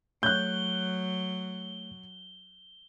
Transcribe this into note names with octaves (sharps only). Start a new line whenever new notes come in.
F#3 A3 C#5 F#6 G6 G7